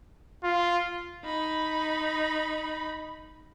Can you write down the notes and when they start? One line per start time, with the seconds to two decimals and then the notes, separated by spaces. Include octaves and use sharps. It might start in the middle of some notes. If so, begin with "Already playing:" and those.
0.44 F4
1.24 D#4 B5